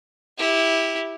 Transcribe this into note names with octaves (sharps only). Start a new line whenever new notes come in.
E4 G4